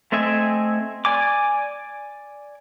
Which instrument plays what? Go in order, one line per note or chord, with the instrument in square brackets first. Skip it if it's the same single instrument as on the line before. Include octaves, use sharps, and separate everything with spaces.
[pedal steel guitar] A3 C4 D#5 E5 G#5
D5 G#5 D6